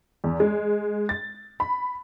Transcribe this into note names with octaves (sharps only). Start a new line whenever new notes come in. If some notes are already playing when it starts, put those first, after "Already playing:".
E2
G#3
A6
B5